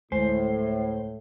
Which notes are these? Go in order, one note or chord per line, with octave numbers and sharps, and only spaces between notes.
D2 A2 G#3 C5